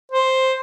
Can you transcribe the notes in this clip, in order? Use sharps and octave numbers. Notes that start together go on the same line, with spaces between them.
C5